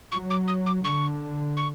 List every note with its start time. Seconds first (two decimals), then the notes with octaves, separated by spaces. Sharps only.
0.12 F#3 C#6
0.30 D6
0.48 D#6
0.66 D6
0.84 D3 C#6
1.57 C#6